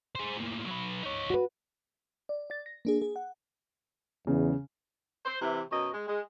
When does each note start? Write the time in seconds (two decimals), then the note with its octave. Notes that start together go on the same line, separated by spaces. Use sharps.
0.15 G#4 C5
0.36 A2 A#3
0.66 F#3 B4
1.03 D#4 C#5
1.30 F#4 B4
2.29 D5
2.50 D5 A6
2.66 A#6
2.85 A#3 D4 G#4
3.02 G#4
3.16 F#5
4.27 E2 C#3
5.25 C5
5.41 C3 E3
5.71 F#2 B2 C#5 D#5
5.93 G#3
6.08 G#3